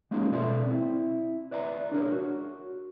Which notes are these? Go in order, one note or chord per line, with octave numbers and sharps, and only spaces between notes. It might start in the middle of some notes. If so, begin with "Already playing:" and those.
G#3 A#3 C#4 D#4 F4 G#4
B2 A4 D5 E5 C6
C4 E4
B4 D5 E5 G#5 A#5
D4 G#4 A#4 C#5
F#4